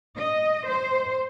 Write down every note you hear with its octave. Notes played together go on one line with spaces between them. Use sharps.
D#5
C5